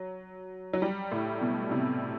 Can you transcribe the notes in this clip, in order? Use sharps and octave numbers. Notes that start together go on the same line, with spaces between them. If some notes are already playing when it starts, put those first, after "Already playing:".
Already playing: F#3
F#3
G3
A2
B2
C3